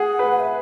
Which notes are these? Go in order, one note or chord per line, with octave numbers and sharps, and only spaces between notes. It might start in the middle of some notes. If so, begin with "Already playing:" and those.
Already playing: G#4 F#5
B4
F#5
E5